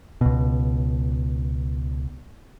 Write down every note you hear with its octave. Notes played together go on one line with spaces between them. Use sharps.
C#2 B2